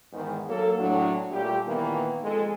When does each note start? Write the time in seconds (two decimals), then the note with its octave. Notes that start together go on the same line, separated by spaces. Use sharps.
0.13 E2 G#2 D#3
0.47 F#3 A#3 A4
0.79 A2 F#3 D4
1.32 A#2 G3 A3 G4
1.66 A#2 D#3 E3 A#3 B3
2.23 F2 G#3 A4